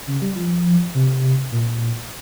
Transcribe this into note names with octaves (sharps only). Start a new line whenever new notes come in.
C#3
G3
F3
C3
A#2